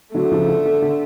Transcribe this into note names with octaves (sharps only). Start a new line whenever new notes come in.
D3 F#3 A3
C#3 F3
D3
D3
D3